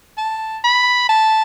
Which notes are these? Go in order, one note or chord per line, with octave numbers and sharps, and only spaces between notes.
A5
B5
A5